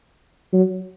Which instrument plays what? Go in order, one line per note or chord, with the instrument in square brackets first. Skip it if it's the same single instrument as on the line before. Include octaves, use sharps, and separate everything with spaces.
[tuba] F#3